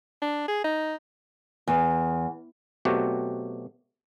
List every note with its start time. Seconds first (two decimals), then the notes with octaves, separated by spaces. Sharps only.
0.22 D4
0.48 G#4
0.64 D#4
1.67 E2
2.85 B2 F#3 A3 C4 F#4 G4